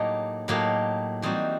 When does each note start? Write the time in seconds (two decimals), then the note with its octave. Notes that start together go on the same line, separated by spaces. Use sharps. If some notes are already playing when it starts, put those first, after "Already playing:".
Already playing: A2 F#3 A#3 D#4 G4
0.48 A2 F#3 A#3 D#4 G4
1.22 E3 G3 C4 D#4 F#4